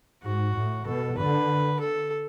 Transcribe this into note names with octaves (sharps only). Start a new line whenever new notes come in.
G#2 F#4
A2
B2 A4
D3 B4
A4